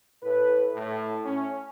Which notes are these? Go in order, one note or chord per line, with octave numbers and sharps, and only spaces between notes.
A2 B4
A2
C#4